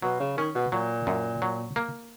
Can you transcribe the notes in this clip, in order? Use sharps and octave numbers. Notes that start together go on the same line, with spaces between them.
B2 F#3
C#3
D#3 C#4
B2
A#2 F#3
F#2
F#3
A#3